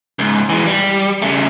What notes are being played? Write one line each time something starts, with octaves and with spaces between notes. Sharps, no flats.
C#2 G#2
E3 G#3
G3
C#3 A3